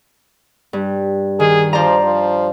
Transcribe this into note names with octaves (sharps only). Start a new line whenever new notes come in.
G2
D#3 G#4
F3 C5 D5 A#5
F3